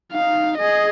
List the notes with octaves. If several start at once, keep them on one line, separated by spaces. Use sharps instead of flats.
D#4 F5
G#4 D#5